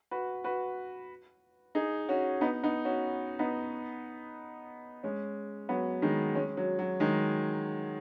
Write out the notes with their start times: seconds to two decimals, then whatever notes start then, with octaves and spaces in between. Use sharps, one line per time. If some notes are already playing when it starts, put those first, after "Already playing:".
0.11 F#4 B4
0.44 F#4 B4
1.75 D#4 G#4
2.09 C#4 F#4
2.41 B3 D#4
2.63 B3 D#4
2.85 C#4 F#4
3.39 B3 D#4
5.03 G#3 C#4
5.69 F#3 B3
6.02 D#3 G#3
6.35 G#3 C#4
6.57 F#3
6.79 F#3
7.00 D#3 G#3